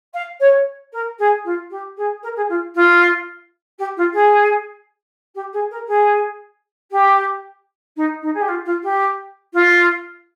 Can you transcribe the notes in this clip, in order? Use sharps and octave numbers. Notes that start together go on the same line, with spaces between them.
F5
C#5
A#4
G#4
F4
G4
G#4
A#4
G#4
F4
F4
G4
F4
G#4
G4
G#4
A#4
G#4
G4
D#4
D#4
G#4
G4
F4
F4
G4
F4